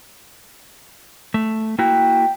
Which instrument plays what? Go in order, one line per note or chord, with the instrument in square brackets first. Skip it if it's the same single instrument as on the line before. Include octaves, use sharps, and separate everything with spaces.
[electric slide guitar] A3
[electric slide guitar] A#3 E4 F#4 [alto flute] G5